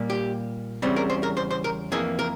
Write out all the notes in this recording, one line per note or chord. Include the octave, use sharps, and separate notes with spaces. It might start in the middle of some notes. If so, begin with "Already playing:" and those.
Already playing: A#2 G3 A#3
G4
E2 C#3 G3 C4
A#4
C5
A#4
C5
C5
A#4
F2 E3 A#3 G#4
A#4